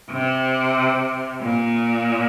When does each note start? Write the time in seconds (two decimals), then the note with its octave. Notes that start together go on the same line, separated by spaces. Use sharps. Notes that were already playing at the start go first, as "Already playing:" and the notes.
0.11 C3
1.42 A#2